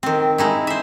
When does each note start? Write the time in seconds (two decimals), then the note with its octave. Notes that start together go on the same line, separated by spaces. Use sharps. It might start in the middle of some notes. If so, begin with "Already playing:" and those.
0.03 D#3 C4
0.38 G#3 D#4 E4
0.67 C5 E5